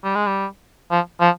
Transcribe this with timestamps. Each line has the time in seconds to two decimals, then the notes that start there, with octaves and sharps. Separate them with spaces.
0.04 G3
0.15 G#3
0.26 G3
0.91 F3
1.20 F3